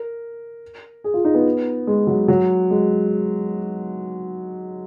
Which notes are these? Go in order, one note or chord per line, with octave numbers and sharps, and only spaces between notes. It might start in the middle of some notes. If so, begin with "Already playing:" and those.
Already playing: A#4
G#4
F4
D#4
B3
G#3
F#3
F#3
G#3